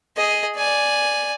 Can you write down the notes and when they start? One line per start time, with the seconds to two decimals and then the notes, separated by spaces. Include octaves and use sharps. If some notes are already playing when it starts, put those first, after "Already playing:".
0.17 G#4 D#5
0.56 D5 G#5